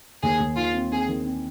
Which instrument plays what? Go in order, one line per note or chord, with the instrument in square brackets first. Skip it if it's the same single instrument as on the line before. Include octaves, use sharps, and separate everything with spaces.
[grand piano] D#2 [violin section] G#4
[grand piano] D#2
[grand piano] D#3 [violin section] F4
[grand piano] C4
[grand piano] C4 [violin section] G#4
[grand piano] D#3
C4